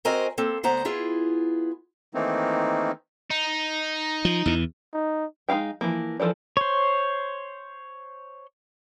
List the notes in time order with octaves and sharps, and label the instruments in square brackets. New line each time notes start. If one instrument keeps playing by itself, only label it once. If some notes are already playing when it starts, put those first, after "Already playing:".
[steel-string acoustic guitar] C4 F#4 A#4 C5 D#5 G#5
A#3 C4 A4
D2 B3 C5 F#5 A#5
B3 E4 F4 G#4
[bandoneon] D#3 E3 A3 A#3 C4 D#4
[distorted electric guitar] D#4
[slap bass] F3
E2 E3
[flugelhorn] D#4
[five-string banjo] G#3 D#4 E4 F5 G5
E3 F3 A#3
E3 F3 A4 A#4 D5
[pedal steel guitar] C5 C#5